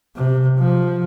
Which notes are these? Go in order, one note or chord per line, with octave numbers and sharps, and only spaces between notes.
C3
F3